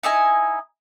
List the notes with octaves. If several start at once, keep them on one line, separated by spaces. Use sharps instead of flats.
D#4 E4 D#5 G#5